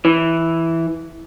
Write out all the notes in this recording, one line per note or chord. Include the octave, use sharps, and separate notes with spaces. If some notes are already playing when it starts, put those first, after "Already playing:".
E3